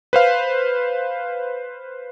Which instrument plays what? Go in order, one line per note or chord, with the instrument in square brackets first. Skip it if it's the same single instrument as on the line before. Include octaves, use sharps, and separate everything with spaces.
[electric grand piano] B4 C5 F5